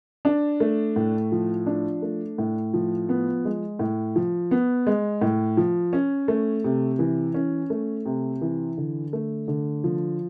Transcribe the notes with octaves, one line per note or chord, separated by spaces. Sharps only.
D4
A3
A2
F3
D4
A3
A2
F3
B3
G#3
A2
F3
B3
G#3
A2
F3
C#4
A3
C3
E3
C#4
A3
C3
E3
D3
A3
D3
F3